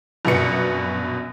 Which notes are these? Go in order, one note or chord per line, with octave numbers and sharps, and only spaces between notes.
A#1 F#2 B2 B3 C#7